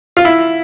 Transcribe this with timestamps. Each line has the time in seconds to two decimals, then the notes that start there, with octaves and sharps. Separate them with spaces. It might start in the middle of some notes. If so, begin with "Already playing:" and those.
0.17 F4
0.25 E4